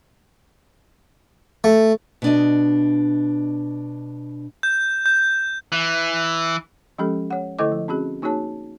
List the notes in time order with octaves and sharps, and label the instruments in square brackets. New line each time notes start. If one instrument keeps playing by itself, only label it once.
[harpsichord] A3
[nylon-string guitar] B2 D4 D#5
[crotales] G6
G6
[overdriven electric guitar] E3
[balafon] F3 G#3 C#4 G4 A4
C#5 F#5
D3 A3 E4 A4 D#5 D6
F3
C4 C#4 F#4 G#4
A#3 D#4 F#4 G#4 C#5 A5